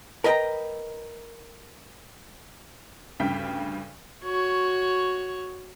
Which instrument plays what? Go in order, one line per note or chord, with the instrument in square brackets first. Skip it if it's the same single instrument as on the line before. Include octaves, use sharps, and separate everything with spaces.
[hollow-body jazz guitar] A#4 B4 D#5 F5 G5 A#5
[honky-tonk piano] D2 G2 C#3 G5 B6
[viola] F#4 C#5